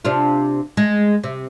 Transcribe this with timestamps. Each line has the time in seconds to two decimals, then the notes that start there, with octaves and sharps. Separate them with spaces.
0.05 C3 D4 F4
0.77 G#3
1.24 C3